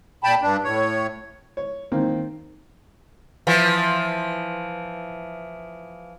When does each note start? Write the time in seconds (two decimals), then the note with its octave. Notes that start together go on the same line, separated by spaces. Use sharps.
0.24 A#2 G5 A5 B5
0.42 G2 D4
0.64 A2 C#5
1.57 C#5
1.92 D#3 A#3 C4
3.47 E3 F3